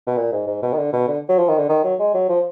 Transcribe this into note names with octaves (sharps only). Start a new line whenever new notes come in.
B2
A#2
G#2
G#2
B2
D#3
D3
B2
D3
F#3
F3
D#3
D3
D#3
F#3
G#3
F#3
F3